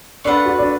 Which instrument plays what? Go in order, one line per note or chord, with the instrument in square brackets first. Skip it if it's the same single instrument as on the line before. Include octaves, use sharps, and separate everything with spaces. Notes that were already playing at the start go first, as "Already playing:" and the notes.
[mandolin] A3 F4 B4 F#5 [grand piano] D4
[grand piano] F#4
D4